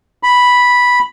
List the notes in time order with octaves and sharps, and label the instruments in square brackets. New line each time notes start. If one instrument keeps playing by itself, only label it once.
[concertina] B5